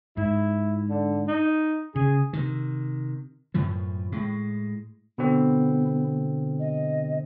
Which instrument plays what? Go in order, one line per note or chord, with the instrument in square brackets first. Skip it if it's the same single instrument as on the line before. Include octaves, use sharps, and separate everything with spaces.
[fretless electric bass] G#2 [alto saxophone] E4
[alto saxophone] D3
D#4
[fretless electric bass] C#3 [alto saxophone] G#4
[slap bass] C3 D#3
F#2 A2 E3 F3
A2 G#3
[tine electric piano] B2 D3 C4 [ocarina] B3
[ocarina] D#5